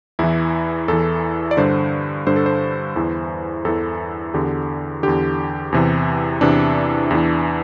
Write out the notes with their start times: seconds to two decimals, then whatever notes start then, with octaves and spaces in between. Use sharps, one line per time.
0.19 E2 E3 E4
0.88 E2 E3 A4
1.51 D5
1.57 G2 D3 C5
2.27 G2 D3 C5
2.36 A4
2.46 C5
2.96 E2 E3
3.65 E2 E3 A4
4.34 E2 D3 G4
5.03 E2 D3 G4
5.72 E2 C3 E3
6.41 E2 C3 E3 D4
7.11 E2 E3